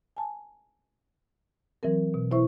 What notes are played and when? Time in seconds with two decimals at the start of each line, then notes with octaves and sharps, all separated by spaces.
0.17 G#5 A5
1.83 E3 F#3 C4 A#4
2.14 B2
2.31 B2 E4 C5 E5 C#6